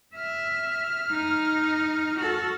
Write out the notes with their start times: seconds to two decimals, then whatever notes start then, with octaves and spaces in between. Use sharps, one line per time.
0.16 E5 F6
1.11 D#4
2.20 F#4 A4